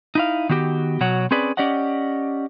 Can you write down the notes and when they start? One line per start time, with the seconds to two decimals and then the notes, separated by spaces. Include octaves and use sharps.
0.15 D#4 E4 F5
0.49 D#3 B3 F#4 G4
1.01 B2 F#3 C#5 F#5
1.31 C4 C#4 G#4 B4 D5
1.57 C#4 G4 D5 D#5 F#5